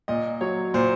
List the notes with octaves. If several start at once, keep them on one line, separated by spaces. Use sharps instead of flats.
A#2 D#5
F#3 C#5
A#2 C5